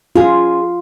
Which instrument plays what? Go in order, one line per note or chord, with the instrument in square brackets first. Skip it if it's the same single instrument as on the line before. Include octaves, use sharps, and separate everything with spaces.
[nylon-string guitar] C#4 G#4 [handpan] F4